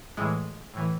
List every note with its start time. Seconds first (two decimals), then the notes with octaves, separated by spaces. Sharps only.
0.17 A2 E3 G#3
0.74 A2 E3